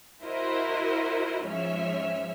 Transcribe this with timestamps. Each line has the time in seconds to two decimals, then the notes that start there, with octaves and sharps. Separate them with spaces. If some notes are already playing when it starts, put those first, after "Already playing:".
0.23 E4 F#4 A#4 C5 D#5 E5
1.47 G#2 F3 C#4 C#5 E5 F6